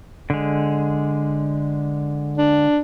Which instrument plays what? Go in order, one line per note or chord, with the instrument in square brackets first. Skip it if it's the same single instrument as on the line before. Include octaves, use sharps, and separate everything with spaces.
[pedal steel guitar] D3 G#3
[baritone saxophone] D4